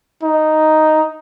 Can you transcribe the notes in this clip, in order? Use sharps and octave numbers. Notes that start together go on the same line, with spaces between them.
D#4